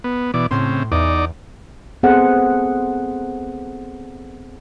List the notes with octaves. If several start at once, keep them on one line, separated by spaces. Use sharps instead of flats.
B3
B2 E3 D5
A2 C#3 C4 C6
E2 D#4 D5
B3 C4 G#4 A4 C5 F#5